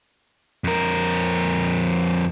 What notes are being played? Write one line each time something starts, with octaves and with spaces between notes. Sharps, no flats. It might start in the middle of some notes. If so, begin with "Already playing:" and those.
F2 A#4